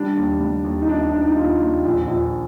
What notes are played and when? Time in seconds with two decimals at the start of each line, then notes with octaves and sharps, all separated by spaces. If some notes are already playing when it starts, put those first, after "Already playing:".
Already playing: G3 D4
0.17 D#2
0.40 G3
0.64 D#2
0.82 D#4
0.89 D#2 D4
1.01 D4
1.12 D#3 D4
1.25 D#4
1.36 D#2 F4
1.60 D#2
1.85 A#1
2.08 A#1